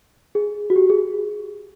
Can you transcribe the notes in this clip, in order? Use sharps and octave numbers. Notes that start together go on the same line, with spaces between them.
G#4
F#4
G4
G#4